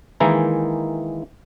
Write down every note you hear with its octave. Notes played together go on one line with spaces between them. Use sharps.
D#3 E3 G#3 A#3 D#4 E4